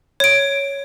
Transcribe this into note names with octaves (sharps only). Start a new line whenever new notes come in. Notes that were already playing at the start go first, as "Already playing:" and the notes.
C#5 D7